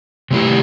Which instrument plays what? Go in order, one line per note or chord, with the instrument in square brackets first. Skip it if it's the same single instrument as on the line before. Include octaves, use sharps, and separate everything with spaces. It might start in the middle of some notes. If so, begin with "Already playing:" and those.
[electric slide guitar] C3 A3 E4 G4